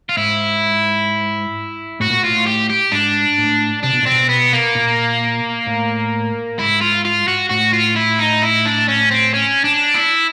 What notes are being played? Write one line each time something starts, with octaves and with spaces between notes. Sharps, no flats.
F4
G#2 E4
A2 F#4
A#2
A2 F4
G4
G4
G#2 D4
A2
C3 D4
B2
A#2
B2 C4
B3
A#3
A#2
A2
G#2 E4
F4
F4
F#4
A2 F#4
F4
E4
D#4
E4
D4
C#4
C4
C#4
D4
E4